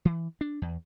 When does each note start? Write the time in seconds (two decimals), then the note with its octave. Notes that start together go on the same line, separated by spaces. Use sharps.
0.05 E3
0.41 D4
0.62 E2